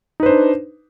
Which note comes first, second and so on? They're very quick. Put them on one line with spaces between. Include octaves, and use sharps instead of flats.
D#4 B4 C5 D4